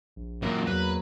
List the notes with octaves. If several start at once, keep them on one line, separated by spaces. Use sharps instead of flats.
A#1
F#2 A#2 A#3 D#4 A#4
E2 F#3 B4